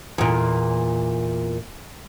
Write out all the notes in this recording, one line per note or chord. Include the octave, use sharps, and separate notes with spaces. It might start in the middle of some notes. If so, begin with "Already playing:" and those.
E2 A#2